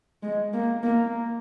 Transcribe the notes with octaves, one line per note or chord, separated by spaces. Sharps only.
G#3
A#3
A#3